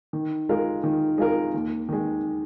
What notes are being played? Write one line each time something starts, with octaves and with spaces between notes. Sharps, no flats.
D#3
G#3 F4 A#4
D#3
G#3 F4 A#4
D#2
D#3 G#3